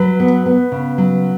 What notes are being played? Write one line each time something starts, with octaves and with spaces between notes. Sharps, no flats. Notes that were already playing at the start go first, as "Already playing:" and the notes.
Already playing: F#3 B4
B3
B3
C#3
F#3